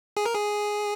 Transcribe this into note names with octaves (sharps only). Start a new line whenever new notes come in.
G#4
A#4
G#4